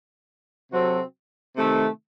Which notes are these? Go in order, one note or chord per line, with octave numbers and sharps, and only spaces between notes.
C3 F#3 C4 F#4 A4
C3 D#3 A3